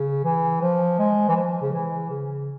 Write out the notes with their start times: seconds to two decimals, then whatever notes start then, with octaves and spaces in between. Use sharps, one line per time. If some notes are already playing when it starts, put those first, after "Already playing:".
Already playing: C#3
0.24 E3
0.61 F3
0.99 G#3
1.28 E3
1.36 F3
1.62 C#3
1.73 E3
2.10 C#3